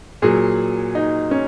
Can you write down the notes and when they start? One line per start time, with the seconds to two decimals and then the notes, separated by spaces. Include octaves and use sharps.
0.22 A#2 F#3 G#4
0.95 D#4
1.31 C#4